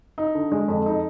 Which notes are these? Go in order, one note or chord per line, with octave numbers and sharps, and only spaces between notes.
D#4
D3
G#3
F2
D#4